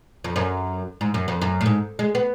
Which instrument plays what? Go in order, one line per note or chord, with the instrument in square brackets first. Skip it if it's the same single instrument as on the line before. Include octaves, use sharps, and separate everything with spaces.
[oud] F2
F#2
G#2
F#2
F2
F#2
A2
G#2
G#3
B3